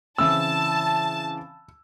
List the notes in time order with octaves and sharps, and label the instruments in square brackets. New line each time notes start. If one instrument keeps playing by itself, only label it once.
[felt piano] C#3 E3 C4 [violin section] A5 [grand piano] E6